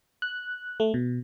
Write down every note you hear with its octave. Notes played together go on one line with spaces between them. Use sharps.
F#6
A3
B2